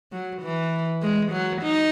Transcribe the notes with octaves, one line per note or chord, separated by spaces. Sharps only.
F#3
E3
G#3
F#3
D#4